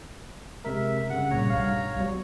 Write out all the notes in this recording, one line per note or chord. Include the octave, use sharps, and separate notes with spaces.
C3 G#3 A#4 E5
G2 C#3 F#5
A#2 G3 C#5 A#5
B1 G2 F5
F#3 G3 B3